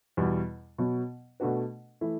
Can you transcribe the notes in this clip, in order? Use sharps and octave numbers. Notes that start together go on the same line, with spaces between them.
E2 B2 G3
B2 F#3 B3
B2 A3 D4 F#4 B4
E3 A3 E4